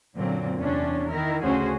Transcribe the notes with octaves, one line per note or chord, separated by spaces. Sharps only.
F#2 A#2 D3 F#3 C4
E2 C3 C#4 D4
D#3 E4 A#4
D2 C#3 C#4 F#4 G#4 C5